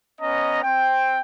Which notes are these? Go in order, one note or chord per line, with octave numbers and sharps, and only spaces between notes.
B3 C#4 D#5 A#5
C4 G5